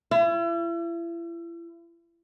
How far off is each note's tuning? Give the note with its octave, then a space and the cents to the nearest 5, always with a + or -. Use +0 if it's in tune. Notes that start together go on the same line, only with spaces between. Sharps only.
E4 +40